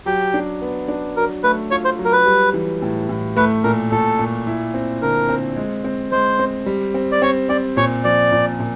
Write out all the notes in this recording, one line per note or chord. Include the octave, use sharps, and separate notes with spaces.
F#3 G4
D4
B3
D4
F#3 A#4
A3 B4
F4 C#5
C5
F#3
A#4
B4
G3
E3
A2
A2
A3 B4
A#2 A#4
A#2 A4
A#2
E4
C4
D3 A#4
C4
G#3
C4
G#3 C5
C4
G3
C4
D5
C4 C#5
C4 D5
A#2 C#5
F3 D5
A#2
A#2